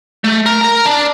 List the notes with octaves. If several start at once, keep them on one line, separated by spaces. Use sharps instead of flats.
A3
A#4
A#4 A#5
D4